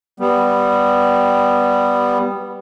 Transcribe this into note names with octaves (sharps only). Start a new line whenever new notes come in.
G3 B3